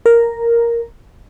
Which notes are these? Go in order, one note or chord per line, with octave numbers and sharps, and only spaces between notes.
A#4